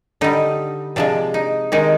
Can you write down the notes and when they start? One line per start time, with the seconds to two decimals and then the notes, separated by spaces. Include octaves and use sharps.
0.21 D3 G3 D#4
0.96 C3 F3 G#3 D4
1.34 D#4
1.72 C3 D#3 G#3 D#4